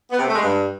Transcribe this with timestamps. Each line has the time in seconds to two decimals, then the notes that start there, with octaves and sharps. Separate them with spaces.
0.11 B3
0.19 C3
0.26 A3
0.34 G#3
0.42 G2